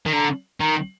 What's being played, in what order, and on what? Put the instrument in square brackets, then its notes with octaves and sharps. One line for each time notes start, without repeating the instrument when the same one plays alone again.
[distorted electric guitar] D#3
[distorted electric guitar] D3 [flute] A#5
[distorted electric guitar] D#3 [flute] A#5